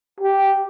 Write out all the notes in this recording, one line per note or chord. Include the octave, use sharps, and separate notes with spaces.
G4